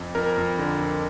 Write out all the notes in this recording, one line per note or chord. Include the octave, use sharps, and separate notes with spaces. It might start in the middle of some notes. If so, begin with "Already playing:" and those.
Already playing: F2
F2 A#4
F2
D3
F2